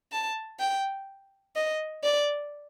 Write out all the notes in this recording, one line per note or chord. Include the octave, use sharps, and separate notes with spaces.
A5
G5
D#5
D5